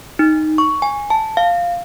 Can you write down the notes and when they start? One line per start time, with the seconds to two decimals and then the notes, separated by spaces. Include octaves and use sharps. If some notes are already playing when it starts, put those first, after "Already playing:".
0.19 D#4
0.58 C#6
0.82 G#5
1.10 A5
1.37 F5